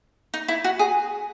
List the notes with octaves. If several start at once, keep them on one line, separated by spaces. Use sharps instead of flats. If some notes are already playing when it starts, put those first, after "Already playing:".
D#4
E4
F#4
G#4